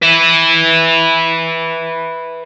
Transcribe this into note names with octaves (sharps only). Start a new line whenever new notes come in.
B4 E5